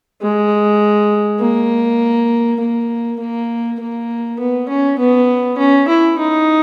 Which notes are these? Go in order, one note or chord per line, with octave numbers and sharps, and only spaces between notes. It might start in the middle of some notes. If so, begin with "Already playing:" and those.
G#3
A#3
A#3
A#3
A#3
B3
C#4
B3
C#4
E4
D#4